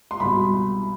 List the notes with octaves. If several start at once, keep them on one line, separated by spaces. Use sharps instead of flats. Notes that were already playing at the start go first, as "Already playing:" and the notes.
C6
C2 B2 B5